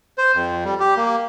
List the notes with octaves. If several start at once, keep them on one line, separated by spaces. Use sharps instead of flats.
C5
F2
G3
G4
A#3